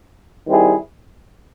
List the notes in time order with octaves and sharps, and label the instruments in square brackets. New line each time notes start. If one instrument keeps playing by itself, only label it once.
[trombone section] D#3 G3 C4 E4 G#4